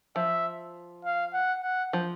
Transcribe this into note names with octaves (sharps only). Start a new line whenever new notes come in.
F3 E5
F5
F#5
F#5
F3